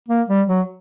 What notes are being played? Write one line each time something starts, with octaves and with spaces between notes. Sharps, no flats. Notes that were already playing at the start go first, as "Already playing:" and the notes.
A#3
G3
F#3